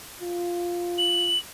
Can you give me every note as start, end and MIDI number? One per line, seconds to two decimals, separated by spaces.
0.22 1.36 65
0.98 1.38 102